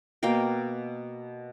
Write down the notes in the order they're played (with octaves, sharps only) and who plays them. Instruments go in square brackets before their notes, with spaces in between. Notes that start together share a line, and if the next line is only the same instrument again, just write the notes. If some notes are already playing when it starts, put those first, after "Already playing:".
[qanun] B2 A#3 F5 G5